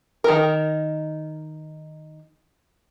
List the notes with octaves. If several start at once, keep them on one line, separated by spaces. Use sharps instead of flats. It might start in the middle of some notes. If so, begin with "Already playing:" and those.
D#3 A#4